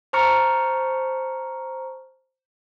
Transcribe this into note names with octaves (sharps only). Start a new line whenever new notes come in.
C5 A5 A#5 C#6 F6 C#7